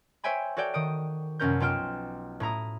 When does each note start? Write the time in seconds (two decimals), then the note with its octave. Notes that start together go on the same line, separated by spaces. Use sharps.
0.24 C5 C#5 E5 G5 G#5 B5
0.57 F#4 A4 C#5 D5 G5
0.74 D#3 D#6 D7
1.39 A#1 F#2 C3 C#4 A#4 G6
1.60 B1 F4 G5 F6 E7
2.40 A2 E4 A#5 D#6